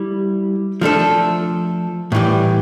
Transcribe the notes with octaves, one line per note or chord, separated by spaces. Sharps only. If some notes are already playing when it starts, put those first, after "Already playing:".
Already playing: G3 E4
F3 A3 D4 A4
A2 E3 G3